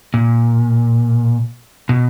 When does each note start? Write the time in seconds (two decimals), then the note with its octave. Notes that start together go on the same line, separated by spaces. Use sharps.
0.14 A#2
1.89 B2